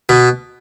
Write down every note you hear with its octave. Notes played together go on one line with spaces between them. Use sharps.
B2